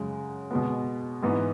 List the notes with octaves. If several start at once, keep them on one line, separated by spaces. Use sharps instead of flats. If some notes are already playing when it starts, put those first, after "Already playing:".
Already playing: F#2 C#3 G#3
B2 G#3 B3
G#2 E3 B3